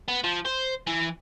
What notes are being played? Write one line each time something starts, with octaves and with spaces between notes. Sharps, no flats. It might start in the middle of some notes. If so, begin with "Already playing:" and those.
B3
F3
C5
E3